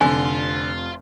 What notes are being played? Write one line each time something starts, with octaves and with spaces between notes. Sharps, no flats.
F1 F2 D3 F4 G#5